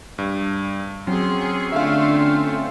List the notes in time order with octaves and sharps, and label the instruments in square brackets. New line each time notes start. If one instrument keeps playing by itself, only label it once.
[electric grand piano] G2
[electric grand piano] F#3 [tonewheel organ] C4 C#4 [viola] G#4 C6
[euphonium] D3 [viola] A3 F4 [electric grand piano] E5 F5